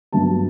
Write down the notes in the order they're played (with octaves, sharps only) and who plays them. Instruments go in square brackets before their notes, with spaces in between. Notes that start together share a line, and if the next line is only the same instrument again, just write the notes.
[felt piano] G2 F#3 B3 A5